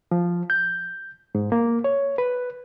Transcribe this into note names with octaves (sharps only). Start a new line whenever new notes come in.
F3
G6
G#2
A#3
C#5
B4